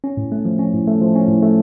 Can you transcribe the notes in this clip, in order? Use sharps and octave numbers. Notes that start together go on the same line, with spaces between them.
C#4
A2
A3
F3
C#4
A2
A3
F3
C#4
A2
A3